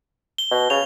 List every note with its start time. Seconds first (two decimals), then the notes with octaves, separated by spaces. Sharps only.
0.38 G7
0.51 B2
0.70 C#3 F7